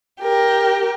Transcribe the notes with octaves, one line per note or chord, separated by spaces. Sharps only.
G4 A#4